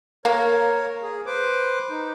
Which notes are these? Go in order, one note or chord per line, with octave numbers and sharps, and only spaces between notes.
A#3 A#4 C#5
G#4
B4 C5 D6
D#4